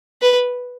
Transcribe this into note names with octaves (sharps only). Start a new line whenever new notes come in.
B4